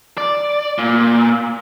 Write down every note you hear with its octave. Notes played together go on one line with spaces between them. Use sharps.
D5
A#2